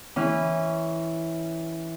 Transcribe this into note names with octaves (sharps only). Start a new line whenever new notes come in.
E3 C#4